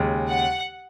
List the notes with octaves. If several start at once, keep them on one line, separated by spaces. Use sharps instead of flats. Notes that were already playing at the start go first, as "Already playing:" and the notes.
Already playing: D#2 C#3 G#3
F#5